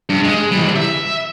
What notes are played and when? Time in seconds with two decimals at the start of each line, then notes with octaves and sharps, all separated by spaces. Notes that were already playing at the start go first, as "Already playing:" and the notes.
0.10 G2
0.24 G#3
0.52 E3 G3
0.76 E5